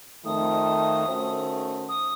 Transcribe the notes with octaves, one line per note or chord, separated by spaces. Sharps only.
F2 D#3 A3 D#6
D#3 A3 C#4 F#4 C5
D#6